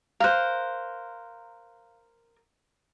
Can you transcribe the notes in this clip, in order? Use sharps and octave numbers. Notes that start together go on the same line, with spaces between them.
A#4 C5 F5 F#6